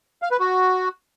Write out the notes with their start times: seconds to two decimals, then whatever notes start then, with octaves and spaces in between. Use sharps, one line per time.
0.22 F5
0.31 B4
0.40 F#4